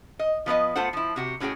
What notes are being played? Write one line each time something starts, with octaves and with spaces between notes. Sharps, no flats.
D#5
F3 B3 B4 D#5
A3 B3 F4 A4 C5 F#5
F3 E4
C3 F#4 G4
A2 C#4 F#4 G#4 G5